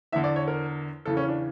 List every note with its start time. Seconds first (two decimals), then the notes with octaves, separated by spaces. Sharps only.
0.12 E2 D3 E5
0.24 D5
0.36 C#5
0.47 A#4
1.05 E2 C#3 E3 A4
1.17 C#4
1.28 D4